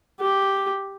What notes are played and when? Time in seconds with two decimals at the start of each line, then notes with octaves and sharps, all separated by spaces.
0.21 G4